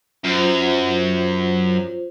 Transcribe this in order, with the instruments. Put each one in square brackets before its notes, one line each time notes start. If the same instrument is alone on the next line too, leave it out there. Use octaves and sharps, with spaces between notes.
[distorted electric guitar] F#2 [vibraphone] F4 C5